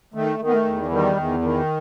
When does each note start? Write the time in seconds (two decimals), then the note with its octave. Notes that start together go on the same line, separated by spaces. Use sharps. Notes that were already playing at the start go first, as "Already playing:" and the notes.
0.14 D#3 A3
0.39 D#3
0.47 B3
0.53 A3
0.65 E2
0.91 D#3 G3
1.17 E2
1.42 D#3